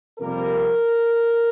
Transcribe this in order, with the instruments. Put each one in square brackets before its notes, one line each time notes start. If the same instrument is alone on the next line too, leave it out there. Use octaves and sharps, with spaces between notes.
[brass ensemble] F2 C3 G3 A#3 A#4